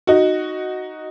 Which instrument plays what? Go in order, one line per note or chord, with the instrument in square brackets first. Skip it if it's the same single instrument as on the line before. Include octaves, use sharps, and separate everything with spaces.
[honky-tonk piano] D#4 F#4